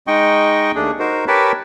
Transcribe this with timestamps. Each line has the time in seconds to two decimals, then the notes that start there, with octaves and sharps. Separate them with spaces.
0.07 G#3 D#4 D#5 G5 C#6
0.75 D#2 A3 D4 G#4
0.99 D#4 F#4 A#4 C5
1.28 G4 A#4 B4 C#5 A5 B5